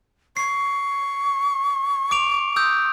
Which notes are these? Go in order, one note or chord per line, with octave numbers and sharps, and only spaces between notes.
C#6 C7
D6 D7 F7
D#6 E6 G6